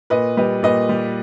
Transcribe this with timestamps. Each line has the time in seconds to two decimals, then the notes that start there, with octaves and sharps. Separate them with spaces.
0.10 A#2 B4 D#5
0.37 G3 B4 D#5
0.63 A#2 B4 D#5
0.89 G3